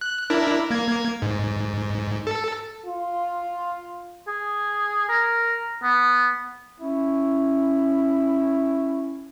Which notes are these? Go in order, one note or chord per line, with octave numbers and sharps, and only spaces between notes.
F#6
D4 E4 A#4
A#3 G#6
G#2
A4
F4
G#4
A#4
B3
C#4 E4